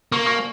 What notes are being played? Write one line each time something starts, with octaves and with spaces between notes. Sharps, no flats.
A#3 C#6
C#6